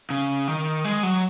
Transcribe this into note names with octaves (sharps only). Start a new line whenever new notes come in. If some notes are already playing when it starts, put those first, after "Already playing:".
C#3
D#3
G#3
F#3